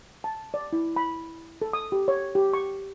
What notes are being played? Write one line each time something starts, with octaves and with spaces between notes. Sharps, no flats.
A5
D5
E4
B5
A4
D#6
G4
C#5
G4
C#6